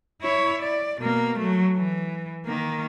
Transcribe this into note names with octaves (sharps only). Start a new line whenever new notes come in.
E4 C#5
D5
B2 A#3
F#3 A3
E3
D#3 A#3